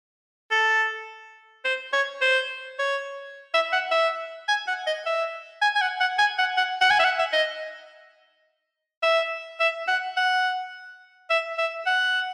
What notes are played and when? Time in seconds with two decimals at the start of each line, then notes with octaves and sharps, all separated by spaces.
0.51 A4
1.65 C5
1.93 C#5
2.22 C5
2.79 C#5
3.54 E5
3.72 F#5
3.91 E5
4.48 G#5
4.68 F#5
4.87 D#5
5.06 E5
5.62 G#5
5.75 G#5
5.81 F#5
6.01 F#5
6.19 G#5
6.38 F#5
6.57 F#5
6.81 F#5
6.90 G#5
6.99 E5
7.04 F#5
7.19 E5
7.33 D#5
9.03 E5
9.60 E5
9.88 F#5
10.17 F#5
11.30 E5
11.58 E5
11.86 F#5